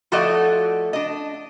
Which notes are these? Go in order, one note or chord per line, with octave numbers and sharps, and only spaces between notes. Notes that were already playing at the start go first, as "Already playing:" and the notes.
F3 A3 F#4 A4 D5 D#5
D4 D#5